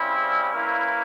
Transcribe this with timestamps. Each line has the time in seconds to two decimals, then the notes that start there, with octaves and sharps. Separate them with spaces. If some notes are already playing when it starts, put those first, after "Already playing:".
Already playing: C#3 G3 C4 E4
0.53 E3 A#3 C#4 E4